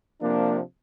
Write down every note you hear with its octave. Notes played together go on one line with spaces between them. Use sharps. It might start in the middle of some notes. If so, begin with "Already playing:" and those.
C3 F3 A#3 D4